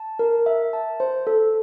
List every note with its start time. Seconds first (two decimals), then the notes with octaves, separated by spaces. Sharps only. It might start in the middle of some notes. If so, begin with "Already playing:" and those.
Already playing: A5
0.19 A#4
0.46 E5
0.73 A5
1.00 C5
1.27 A4